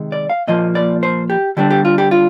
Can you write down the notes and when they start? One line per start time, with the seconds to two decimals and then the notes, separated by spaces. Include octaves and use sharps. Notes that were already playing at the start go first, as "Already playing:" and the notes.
Already playing: C3 D#3 G#3
0.12 D5
0.30 F5
0.47 A#2 F3 A#3 D#5
0.75 D5
1.03 C5
1.30 G4
1.57 D3 G3 D4 G4
1.70 G4
1.85 F4
1.98 G4
2.11 F4